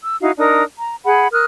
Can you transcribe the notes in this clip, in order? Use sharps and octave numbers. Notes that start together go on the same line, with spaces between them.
E6
D#4 E4 F#4 F5
D4 D#4 A#4 D#6
A#5
G#4 F#5 B5
A#4 D#6 F6 F#6